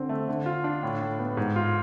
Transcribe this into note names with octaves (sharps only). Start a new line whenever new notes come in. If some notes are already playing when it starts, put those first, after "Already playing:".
Already playing: D3 C4
A3
D3
F4
D4
A2
A2
B3
G#2
F4